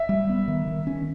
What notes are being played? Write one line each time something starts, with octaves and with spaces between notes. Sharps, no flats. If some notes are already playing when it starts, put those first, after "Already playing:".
Already playing: E5
G3
B3
D#3
D#3
C#4